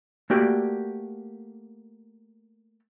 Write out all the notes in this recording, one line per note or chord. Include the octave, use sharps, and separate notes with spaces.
A3 A#3 F#4 G4 D5